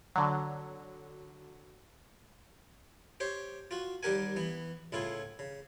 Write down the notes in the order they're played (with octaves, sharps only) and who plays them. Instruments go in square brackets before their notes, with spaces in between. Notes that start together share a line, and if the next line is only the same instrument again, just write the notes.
[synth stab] D3 F#3
[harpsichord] G4 C5 C#5
F4 F#4
D#2 G3 G4 A#4 F#5 G#5
E3 B3
C#2 A2 E4 F4 G#4
C#3